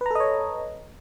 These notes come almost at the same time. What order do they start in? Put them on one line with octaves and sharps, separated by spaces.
B4 A#5 A4 D#5 C#5